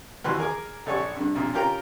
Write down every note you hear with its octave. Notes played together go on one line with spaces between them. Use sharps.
D#2 E3 F#4 B4 C6 F#6
G#4 A#4 G#5 D6
A#1 A4 C#5 D5 G#5 C#6
G2 D3
B1 F2 A#2 D3
C#4 F4 G4 A#4 G5 A#5